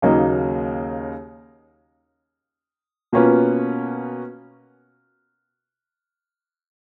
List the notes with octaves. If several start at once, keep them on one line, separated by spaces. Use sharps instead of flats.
D#2 C#3 F#3 A#3 D#4
B2 A#3 C#4 F4 B4